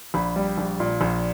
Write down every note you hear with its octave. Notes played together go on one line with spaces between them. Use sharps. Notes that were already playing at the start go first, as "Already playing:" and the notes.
A#1 B5
G3
A#1
A#2
A#1